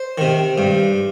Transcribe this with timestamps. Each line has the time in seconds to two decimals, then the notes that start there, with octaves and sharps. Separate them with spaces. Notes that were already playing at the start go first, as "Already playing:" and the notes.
Already playing: C5
0.18 C3 D#3
0.58 G2